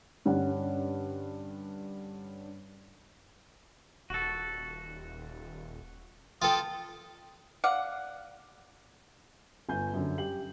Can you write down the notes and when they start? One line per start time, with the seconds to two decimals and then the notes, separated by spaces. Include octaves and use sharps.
0.25 G2 D3 C#4 F#5
4.10 D#1 F#4 A4
6.42 F4 A4 G5 D#6
7.64 D5 F5 F#5
9.69 G1 G#5 G6
9.94 F#2 D3
10.18 G4 F#7